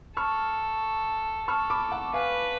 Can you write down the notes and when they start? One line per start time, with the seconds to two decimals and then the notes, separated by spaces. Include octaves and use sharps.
0.17 A4 C#6 F6
1.48 A4 C#6 F6
1.70 B5 D6
1.91 F#5 A5
2.14 B4 F5 G#5